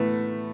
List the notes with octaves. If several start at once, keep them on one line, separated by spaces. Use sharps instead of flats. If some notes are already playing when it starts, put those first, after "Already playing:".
Already playing: A2 A3 B3